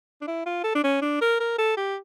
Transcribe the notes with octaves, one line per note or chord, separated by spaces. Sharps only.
D4
E4
F4
A4
D4
C#4
D4
A#4
A#4
A4
G4